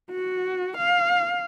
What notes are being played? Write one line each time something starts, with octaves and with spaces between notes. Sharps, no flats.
F#4
F5